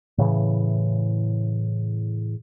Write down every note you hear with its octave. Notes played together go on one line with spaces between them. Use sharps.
A2 C#3 E3